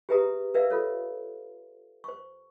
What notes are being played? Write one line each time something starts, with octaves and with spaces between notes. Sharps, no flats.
G4 G#4 B4 E5 A#5 D#6
A#4 B4 D5 E5 F5
F4 A4 C#5
C5 C#6